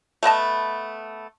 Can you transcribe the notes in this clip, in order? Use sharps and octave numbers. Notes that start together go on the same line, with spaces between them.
A3 B3 D#5 A5